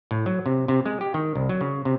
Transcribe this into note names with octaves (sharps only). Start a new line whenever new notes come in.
A2
F#3
C3
C3
G#3
G4
D#3
C2
F#3
C#3
C3